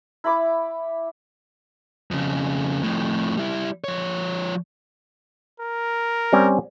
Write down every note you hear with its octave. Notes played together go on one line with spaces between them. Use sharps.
E4 B5 D6 E6
F2 C#3
F2 A2
G3 E4
F3 C#5
A#4
G3 C4 C#4